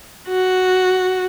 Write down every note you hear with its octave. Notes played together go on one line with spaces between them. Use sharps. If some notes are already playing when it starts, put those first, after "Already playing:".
F#4